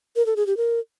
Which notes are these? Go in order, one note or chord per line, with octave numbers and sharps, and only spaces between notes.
A#4
A4
G#4
G4
A#4